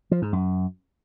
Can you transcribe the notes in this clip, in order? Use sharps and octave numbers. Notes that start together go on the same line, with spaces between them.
F3
G#2
F#2